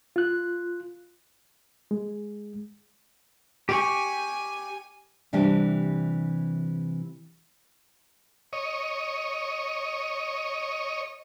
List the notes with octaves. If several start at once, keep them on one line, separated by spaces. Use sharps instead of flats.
F4 F#6
G#3
G4 G#5 C#6
C3 E3 G3 D4 G4
C#5 D#5